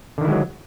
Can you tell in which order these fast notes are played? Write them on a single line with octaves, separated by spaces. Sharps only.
D3 D#3 E4 G#3 F#3